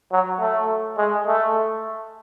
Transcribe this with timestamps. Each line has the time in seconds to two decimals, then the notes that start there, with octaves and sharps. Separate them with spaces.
0.12 F#3
0.40 A3
0.98 G#3
1.27 A3